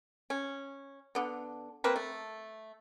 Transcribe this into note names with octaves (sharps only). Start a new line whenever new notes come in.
C#4
D3 B3
A#3 C4 A#4 B4
A3